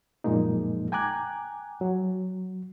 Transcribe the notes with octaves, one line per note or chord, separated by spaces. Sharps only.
F#2 A#2 F3 G#3 A#3 D#4
G5 G#5 A#5 D6 F#6 G#6
F#3